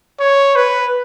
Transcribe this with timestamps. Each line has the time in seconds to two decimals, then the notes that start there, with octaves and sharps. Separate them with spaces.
0.20 C#5
0.56 B4